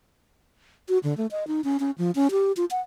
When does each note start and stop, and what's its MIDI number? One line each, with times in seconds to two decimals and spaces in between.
0.89 0.98 66
1.03 1.16 50
1.17 1.27 57
1.31 1.47 75
1.47 1.61 63
1.64 1.77 61
1.80 1.91 61
1.98 2.11 53
2.15 2.28 61
2.31 2.52 67
2.57 2.65 65
2.71 2.80 78